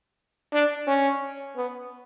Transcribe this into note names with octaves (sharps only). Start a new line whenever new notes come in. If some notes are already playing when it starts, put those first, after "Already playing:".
D4
C#4
B3